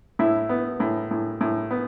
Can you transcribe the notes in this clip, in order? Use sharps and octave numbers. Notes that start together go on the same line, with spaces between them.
A2 E4
B3
A2
A2
A2
B3